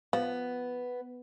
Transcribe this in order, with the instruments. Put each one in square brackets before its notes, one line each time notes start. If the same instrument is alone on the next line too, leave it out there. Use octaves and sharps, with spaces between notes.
[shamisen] F3 [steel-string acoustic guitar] B3